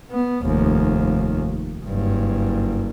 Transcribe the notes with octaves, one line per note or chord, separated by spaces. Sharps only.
B3
F1 D#2
F#1 G2